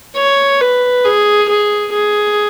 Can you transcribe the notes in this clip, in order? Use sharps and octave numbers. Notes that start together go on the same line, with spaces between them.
C#5
B4
G#4
G#4
G#4